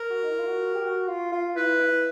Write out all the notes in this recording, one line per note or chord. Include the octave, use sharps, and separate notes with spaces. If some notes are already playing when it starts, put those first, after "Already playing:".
Already playing: A#4
F#4
D#4
E4
F4
F#4
G4
F#4
F4
F4
E4 B4
E4